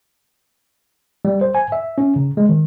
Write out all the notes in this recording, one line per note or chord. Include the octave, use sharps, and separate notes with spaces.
G3
C5
G#5
E5
C#4
C#3
G#3
D#3